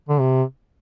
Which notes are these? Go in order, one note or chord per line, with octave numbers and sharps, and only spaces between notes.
D3
C3